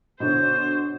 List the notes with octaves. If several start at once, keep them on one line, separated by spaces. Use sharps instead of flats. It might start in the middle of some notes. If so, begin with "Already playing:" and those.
B2 D3 C5 C#5